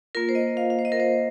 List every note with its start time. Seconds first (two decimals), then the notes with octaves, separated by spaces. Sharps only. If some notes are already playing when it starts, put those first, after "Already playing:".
0.15 A#3 F4 A#4
0.29 C5
0.35 D#5
0.57 F5
0.70 F5
0.79 C5
0.85 D#5
0.92 A#4
1.00 C5